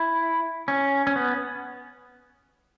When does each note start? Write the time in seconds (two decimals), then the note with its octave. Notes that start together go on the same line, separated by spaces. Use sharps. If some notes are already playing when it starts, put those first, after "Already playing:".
Already playing: E4
0.68 C#4
1.07 C#4
1.16 B3